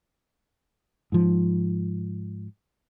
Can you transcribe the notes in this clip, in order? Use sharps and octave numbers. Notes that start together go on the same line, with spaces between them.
G#2 F3